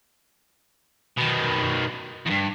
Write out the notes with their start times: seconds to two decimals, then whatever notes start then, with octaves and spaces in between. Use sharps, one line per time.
1.18 B2 D#3
2.26 E2 G2